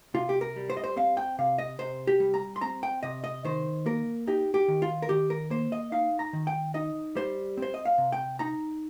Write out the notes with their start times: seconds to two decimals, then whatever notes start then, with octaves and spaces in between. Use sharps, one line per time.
0.14 C3 F4
0.29 G4
0.41 A#4
0.56 G3
0.70 C5
0.77 D#5
0.84 C5
0.96 C4 F5
1.17 G5
1.39 C3 F5
1.58 D#5
1.79 C3 C5
2.07 G4
2.20 G3
2.34 A#5
2.56 C6
2.61 C4 A#5
2.83 G5
3.03 C3 D#5
3.24 D#5
3.44 D#3 C5
3.86 A#3 A#4
4.27 D#4 G4
4.54 G4
4.68 D#3
4.82 F4
5.02 A#4
5.09 D#3 G4
5.30 A#4
5.50 A#3 C5
5.72 D#5
5.92 D#4 F5
6.19 A#5
6.33 D#3
6.47 G5
6.74 D#4 D#5
7.15 G3 C5
7.57 C4
7.62 C5
7.74 D#5
7.85 F5
7.98 C3
8.12 G5
8.39 D#4 A#5